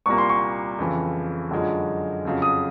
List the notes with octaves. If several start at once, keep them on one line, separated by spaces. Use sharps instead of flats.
C2 A#2 G3 A#3 C#6
C6
C#6
F2 C#3 E3
F#2 D3 F3 G#3
F2 C#3 F#3
D#6